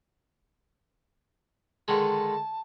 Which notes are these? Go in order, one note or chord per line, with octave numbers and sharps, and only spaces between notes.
D3 D#3 G#3 A5